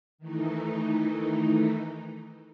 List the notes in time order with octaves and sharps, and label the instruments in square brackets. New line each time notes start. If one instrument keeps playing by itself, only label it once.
[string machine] D#3 E3 A3 D#4